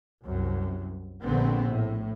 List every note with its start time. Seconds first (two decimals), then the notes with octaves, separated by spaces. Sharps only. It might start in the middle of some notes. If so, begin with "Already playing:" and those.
0.24 C2 F#2
1.23 A#1 D3 B3 C4
1.71 A2